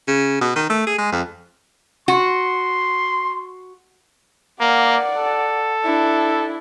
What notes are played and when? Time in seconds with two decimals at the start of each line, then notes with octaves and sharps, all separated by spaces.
0.08 C#3
0.41 B2
0.56 D#3
0.70 A3
0.87 G#4
0.98 G#3
1.12 F2
2.08 F#4 C6
4.61 A#3 D5 F#5
5.18 A4
5.85 D4 E4